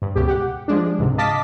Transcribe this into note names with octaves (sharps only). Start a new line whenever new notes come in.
G2
C#2 B2 G4
G4 F#5
F3 G#3 D4
C#2 G#2 C3
D#5 F5 A5 D6 A6 B6